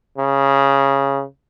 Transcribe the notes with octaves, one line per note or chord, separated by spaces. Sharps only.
C#3